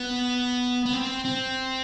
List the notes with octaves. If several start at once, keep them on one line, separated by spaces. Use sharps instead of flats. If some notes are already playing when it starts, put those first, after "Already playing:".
Already playing: B3
B3
C4
C4